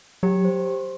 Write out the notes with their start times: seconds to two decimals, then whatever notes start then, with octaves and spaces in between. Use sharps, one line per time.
0.23 F#3 G4
0.45 C5